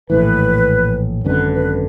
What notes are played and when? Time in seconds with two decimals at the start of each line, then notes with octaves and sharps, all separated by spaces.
0.10 A#1 A2 E3 B4
1.25 G#1 F#2 D3 B4
1.53 B4